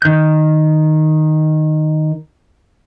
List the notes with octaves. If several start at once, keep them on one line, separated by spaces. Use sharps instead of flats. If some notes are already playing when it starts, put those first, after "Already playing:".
D#3 G6